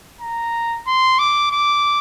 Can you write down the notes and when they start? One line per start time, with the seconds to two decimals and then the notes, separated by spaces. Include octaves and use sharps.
0.21 A#5
0.87 C6
1.19 D6
1.51 D6